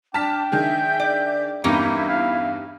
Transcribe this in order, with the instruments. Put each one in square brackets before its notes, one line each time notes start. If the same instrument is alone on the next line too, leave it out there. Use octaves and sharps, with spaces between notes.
[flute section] D4 D6 [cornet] G5 [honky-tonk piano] A5 F6 B6
[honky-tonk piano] D#3 D4 G#4 [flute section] E5 G6
[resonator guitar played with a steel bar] D5
[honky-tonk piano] E2 G2 E3 [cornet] A#3 [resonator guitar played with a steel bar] C#4 D#4 G4 [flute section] E4
[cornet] F5